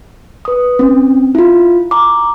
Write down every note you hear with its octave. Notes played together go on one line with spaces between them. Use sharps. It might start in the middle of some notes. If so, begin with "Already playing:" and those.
B4 D#6
C4 C#4
E4 F4
A#5 D6